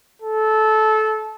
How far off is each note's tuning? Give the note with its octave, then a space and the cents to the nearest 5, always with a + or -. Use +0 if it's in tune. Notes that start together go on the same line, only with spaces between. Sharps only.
A4 -20